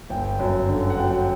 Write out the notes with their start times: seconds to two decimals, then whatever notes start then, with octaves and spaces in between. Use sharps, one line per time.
0.10 G1 G5
0.39 F#2
0.68 D3
0.90 F#5
0.98 F#3 G5